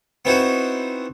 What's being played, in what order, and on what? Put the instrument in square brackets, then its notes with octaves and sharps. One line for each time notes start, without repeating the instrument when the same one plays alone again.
[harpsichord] B3 C4 D#4 E4 F#4